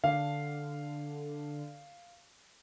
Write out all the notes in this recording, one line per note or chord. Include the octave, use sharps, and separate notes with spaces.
D3 F5